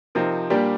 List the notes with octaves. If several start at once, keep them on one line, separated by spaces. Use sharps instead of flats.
C3 F3 C4 D#4 A#4
A#2 G3 D4 G4 A#4